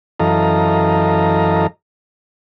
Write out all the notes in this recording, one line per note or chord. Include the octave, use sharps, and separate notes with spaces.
F#2 E3 A4 D#5 F5 A#5